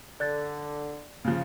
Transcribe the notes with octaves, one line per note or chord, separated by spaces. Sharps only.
D3 D5 F#6 A6
C#3 F3